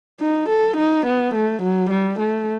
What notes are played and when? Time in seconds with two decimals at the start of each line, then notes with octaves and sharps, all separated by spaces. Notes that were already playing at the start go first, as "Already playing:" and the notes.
0.21 D#4
0.49 A4
0.77 D#4
1.06 B3
1.35 A3
1.62 F#3
1.90 G3
2.19 A3